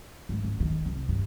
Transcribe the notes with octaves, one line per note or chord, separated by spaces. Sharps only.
G#2
C#3
D#3
C2
G2